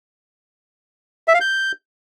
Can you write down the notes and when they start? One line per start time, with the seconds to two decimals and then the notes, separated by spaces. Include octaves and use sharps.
1.28 E5
1.34 F5
1.41 G6